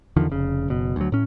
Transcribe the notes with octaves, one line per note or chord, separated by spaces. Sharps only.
E2 D3 D#3 F3
F1 C#3
F#1 B2
D2 F#3
A2 C#4